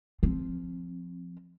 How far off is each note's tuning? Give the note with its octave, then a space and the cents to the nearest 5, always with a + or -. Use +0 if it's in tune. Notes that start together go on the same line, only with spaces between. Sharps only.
F3 +0 C4 +0